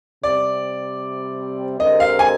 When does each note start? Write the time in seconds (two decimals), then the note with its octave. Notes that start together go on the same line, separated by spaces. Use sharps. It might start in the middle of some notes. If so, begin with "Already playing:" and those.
0.23 C3 G3 C4 D5
1.80 D3 G#3 C4 G4 A#4 D#5
2.00 F5
2.19 G#5